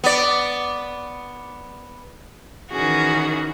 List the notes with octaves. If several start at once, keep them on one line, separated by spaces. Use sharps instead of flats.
B3 D5
D#3 E3 C#4 F#4 G#4